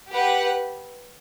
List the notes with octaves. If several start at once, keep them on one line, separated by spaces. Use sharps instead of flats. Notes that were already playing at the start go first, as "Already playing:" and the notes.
G4 B4 F#5